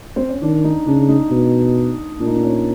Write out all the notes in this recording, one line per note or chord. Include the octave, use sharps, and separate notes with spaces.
C4
C#4
D#3 D4
D#4
C#3 D4
D#4
B2
A#2 D4
D#4
D4
C#4